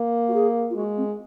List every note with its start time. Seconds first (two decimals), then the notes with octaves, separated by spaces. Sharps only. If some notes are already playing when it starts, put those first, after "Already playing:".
Already playing: A#3
0.28 F#4
0.34 G#4
0.70 F4
0.76 G#3 F#4
0.97 C4